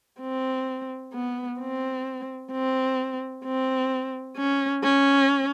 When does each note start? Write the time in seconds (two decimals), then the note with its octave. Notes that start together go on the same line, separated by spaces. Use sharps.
0.21 C4
1.14 B3
1.60 C4
2.52 C4
3.45 C4
4.37 C#4
4.83 C#4